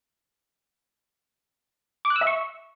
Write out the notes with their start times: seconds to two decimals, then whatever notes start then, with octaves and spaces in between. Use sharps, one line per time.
2.05 D6
2.10 F#6
2.16 E6
2.21 E5
2.27 C#6